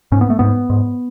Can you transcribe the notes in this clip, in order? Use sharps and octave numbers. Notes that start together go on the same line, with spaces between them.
G#2 C#4
B3
A3
G#2 B3
G#2